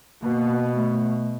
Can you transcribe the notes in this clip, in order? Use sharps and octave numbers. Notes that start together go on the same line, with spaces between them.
B2 A#3
A3